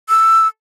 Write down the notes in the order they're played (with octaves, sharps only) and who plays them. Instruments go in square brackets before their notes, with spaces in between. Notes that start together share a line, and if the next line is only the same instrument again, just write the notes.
[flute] E6